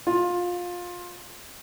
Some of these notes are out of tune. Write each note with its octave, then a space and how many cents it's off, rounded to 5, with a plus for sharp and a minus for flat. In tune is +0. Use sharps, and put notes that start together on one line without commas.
F4 +20